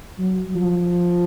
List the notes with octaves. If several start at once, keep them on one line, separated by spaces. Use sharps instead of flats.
F#3
F3